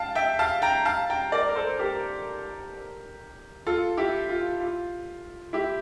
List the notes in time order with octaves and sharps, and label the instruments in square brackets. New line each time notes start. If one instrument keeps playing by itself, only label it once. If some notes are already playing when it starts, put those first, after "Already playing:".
Already playing: [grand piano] F5 G5 A5
E5 G5
F5 A5
G5 A#5
F5 A5
G5 A#5
A#4 D5
A#4
A4 C5
G4 A#4
F4 A4
E4 G4
F4
F4
E4 G4